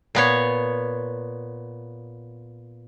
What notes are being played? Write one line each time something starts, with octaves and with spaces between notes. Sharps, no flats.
A#2 B3 C#5